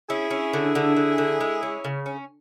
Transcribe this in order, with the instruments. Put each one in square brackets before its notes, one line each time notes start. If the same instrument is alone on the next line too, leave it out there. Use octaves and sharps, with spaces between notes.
[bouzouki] C#4 [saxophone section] E4 G#4
[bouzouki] C#4
D3
D3
D3
D3
G#3
C#4
C#3
C#4